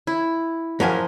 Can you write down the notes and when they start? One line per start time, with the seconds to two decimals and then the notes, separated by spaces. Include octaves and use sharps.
0.07 E4
0.80 F#2 F3 A#4 C5 G#5